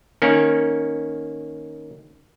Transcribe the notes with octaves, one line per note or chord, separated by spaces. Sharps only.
D#3 A#3 C#4